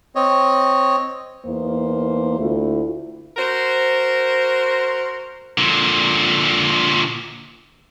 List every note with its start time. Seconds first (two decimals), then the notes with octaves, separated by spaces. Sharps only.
0.15 C4 C#5 D#5
1.46 E2 A#3 D#4 C5
2.39 D2 A3 E4 F4
3.37 F#4 A#4 C5
5.58 A#2 D3